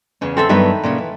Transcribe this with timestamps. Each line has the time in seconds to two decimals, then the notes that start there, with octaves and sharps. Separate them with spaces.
0.21 E2 C#3 C#4
0.37 C4 A4 E5
0.49 G2 D#3 F#3 B3 B4 E5
0.83 A#2 C#3 C#4
0.98 E3